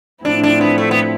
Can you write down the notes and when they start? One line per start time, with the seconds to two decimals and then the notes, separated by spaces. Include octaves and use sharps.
0.25 A2 F3 C4 D4 E4
0.43 D4
0.61 B3
0.78 A3
0.91 B3